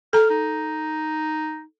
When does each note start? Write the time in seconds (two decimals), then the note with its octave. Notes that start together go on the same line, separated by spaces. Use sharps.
0.13 A4 A#5 F6
0.30 D#4